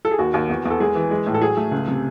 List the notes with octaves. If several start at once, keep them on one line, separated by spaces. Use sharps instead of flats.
A4
G#4
D#2 F#4
D#2
E2
E2
A4
G#3 G#4
E3
G#3
A2
A4
F#3 G#4
A3
C#2
C3